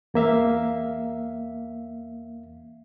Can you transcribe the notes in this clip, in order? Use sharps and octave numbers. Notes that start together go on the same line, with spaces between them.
E2 A#3 E5 F5